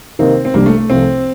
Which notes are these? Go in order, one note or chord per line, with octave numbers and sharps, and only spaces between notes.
C3 D#3 A#3 C4 D#4
C4
C2 C3 G3 A#3 D4
A3
A3
C2 C3 F3 A3 C4